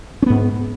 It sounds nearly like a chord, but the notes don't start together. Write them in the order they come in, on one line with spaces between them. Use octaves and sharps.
C#4 B3 G#2